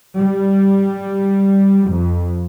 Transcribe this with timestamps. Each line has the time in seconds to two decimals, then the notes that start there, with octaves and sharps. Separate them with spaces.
0.16 G3
1.90 F2